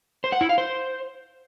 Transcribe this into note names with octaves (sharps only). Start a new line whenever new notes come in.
C5
F#5
E4
F5
C5